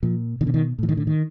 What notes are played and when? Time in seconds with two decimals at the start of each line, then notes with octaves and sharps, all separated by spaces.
0.03 A#2 F3
0.41 B2 D#3
0.47 D3
0.54 D#3
0.79 A2 E3
0.89 D#3
0.97 D3
1.07 D#3